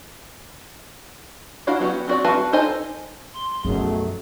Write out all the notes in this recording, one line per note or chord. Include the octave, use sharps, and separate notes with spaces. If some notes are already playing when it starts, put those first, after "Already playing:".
D4 E4 F#4 D#5 F5
F#3 B3 C#4 F#4 G4
C4 F#4 D5
C4 F#4 B4 F5 A5
D#4 A4 C5 D#5 G#5
C6
B1 F#2 F3 F#3 A3 G#4